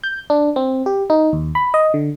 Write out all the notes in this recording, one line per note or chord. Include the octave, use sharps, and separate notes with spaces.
G6
D4
C4
G4
D#4
D#2
B5
D#5
D3